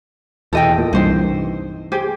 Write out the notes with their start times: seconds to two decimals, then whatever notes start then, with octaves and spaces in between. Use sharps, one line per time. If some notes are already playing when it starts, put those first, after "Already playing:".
0.53 E2 B2 A4 D#5 G5
0.78 A#2
0.93 C2 G2 E3 D#4 C5
1.92 G4 G#4 C5